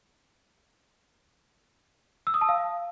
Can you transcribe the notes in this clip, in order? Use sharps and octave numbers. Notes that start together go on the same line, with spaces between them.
E6
D#6
A5
F5